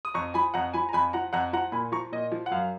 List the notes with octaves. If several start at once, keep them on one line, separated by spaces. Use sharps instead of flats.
D#6
F2 A#5 C#6
F3 G#5 B5
F2 F#5 A#5
F3 G#5 B5
A#5
F2 G#5 B5
F3 F#5 A#5
F2 F#5 A#5
F3 F#5 A#5
A#2 G#5 B5
F3 A#5 C#6
A#2 D#5
F3
F#5
F#2 F5